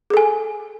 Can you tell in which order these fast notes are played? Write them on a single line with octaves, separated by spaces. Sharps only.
G#4 A4 G#5